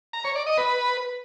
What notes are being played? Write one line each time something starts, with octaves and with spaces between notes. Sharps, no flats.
A#5
C#5
D5
D#5
B4